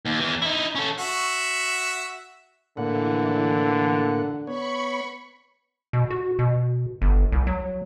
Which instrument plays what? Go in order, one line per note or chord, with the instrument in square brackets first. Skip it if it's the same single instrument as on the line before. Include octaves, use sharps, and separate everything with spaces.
[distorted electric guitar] D#2
E2 E3
D#4 E4
C#4 A4
[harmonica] F#4 E5
[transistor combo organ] A2 A#3 F#5 [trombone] D3 [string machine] E3
[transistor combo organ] B3 C#5 [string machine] B5 C#6 C#7
[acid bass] B2
F#4
B2
G1
C2
F#3